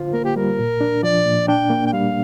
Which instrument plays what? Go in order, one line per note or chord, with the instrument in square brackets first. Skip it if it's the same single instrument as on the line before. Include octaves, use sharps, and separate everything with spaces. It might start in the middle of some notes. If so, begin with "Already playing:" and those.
Already playing: [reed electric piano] D3 F4 C5
[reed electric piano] A#3 [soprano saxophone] A#4
[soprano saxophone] G4
[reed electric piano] G3 [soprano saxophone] A#4
[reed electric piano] A#2
D4
[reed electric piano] F3 [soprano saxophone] D5
[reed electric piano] A#2
[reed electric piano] D4 [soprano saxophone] G5
[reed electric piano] A#3
[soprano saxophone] G5
[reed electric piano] G3 [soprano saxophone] F5